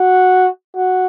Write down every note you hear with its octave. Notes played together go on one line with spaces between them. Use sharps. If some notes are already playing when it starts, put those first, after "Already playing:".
Already playing: F#4
F#4